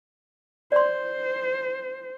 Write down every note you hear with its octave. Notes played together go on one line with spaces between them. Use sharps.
C5 D5 C6